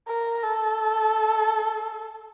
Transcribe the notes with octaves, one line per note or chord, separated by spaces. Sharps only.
A#4
A4